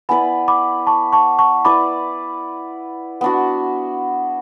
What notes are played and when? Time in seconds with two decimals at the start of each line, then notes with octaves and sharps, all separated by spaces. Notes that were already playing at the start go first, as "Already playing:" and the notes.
0.09 B3 E4 B4 D5 G#5 B5
0.48 B5 D6
0.87 A5 C#6
1.13 A5 C#6
1.39 A5 C#6
1.65 E4 B4 D5 B5 D6
3.21 B3 D4 F#4